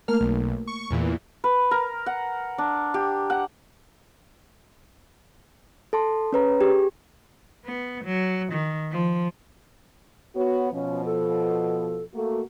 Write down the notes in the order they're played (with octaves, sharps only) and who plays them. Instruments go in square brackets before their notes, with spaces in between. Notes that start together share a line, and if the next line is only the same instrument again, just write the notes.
[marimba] A3 A#3 A#4 [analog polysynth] F6
[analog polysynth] B1
C#6
E2 A#2 E3
[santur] B4
A#4
F#5
D4
G4
F#5
[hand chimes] A4 A5 C6
C#4 G#4 B4 C#5 A#5
G4 G#4
[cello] B3
F#3
D#3
F3
[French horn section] B3 F#4 [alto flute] C#5
[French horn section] B2 F3 [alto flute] C#4
[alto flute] A4
[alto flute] A3 [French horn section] A#3 F#4